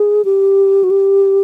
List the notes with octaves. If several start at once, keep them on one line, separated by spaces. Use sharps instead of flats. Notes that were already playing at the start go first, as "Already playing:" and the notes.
Already playing: G#4
G4
F#4
G4